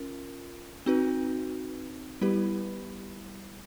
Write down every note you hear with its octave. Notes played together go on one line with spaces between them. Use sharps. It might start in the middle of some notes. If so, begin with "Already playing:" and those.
Already playing: C#4 F4 A#4
C4 D#4 F#4 B4
G3 B3 E4 G4 B4